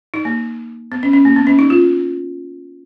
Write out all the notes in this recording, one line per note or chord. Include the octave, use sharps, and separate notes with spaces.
D#4
A#3
B3
C#4
C#4
A#3
B3
C#4
D#4
F4